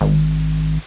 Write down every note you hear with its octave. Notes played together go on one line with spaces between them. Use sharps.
G#1